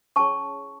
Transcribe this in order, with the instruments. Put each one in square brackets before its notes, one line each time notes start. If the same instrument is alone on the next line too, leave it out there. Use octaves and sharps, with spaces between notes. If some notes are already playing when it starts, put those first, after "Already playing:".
[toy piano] C#4 E4 G#4 C#5 A5 C#6